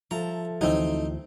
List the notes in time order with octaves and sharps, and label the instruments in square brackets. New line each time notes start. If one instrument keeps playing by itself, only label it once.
[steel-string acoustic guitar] F3 A4 E5 [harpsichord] A#5
[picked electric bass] D2 E3 F#3 [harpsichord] C4 D#4